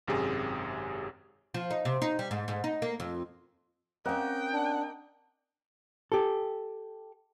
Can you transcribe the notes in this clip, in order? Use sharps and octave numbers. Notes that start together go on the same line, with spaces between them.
G#1 F#2 C3 G4 G#4
F3
D#4
C3
D#4
G3
G#2
G#2
D#4
A#3
F2
A#3 C4 C#4 D#5 F#5 G5
D4
G4 A4